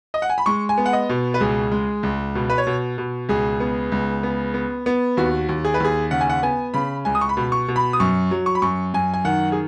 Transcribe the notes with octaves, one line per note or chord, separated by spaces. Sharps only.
D#5
F#5
G#5
B5
G#3 C#6
G#5
B3
F#5
D#5
B2
B4
C#2 G#4
G#3
C#2
B2
B4
C#5
B2
B2
C#2 G#4
B3
C#2
B3
B3
B3
D#2 F#4
D#2
G#4
B4
D#2 G#4
C#3 F#5
G#5
F#5
B3 G#5
C#3 B5
C#2 G#5
D#6
C#6
B5
B2
C#6
B2
B5
D#6
F#2 C#6
F#3
C#6
B5
F#2 C#6
F#2 G#5
G#5
D#3 F#5
G#4